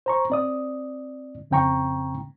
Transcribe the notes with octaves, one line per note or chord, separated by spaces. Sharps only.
C5 A#5 C#6
C4 D5 D#6
F2 C#3 C4 G5 A#5 C#6